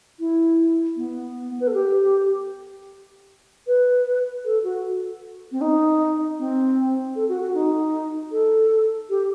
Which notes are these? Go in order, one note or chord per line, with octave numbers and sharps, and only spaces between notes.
E4
B3
B4
A4
G4
B4
A4
F#4
C4
D#4
C4
A4
F#4
F#4
D#4
A4
G4